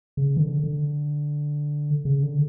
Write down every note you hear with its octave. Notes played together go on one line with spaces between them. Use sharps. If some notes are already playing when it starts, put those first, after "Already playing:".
C#3
E3
D3
D3
C#3
D3